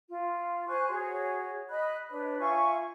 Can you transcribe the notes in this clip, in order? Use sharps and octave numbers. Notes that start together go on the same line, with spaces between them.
F4
C5 G#5 C#6 F#6
F#4 G#4 C#5
D#5 B5 F#6
D4 B4 C#5
F4 E5 G#5 C#6